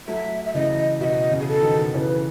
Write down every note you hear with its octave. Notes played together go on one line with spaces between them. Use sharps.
F#3 A3 E5
E5
C#3 E3 D#5
B2 D#5 E5
C#3
G#4
A4
B2 D#3
C#3 E3 B4 C#5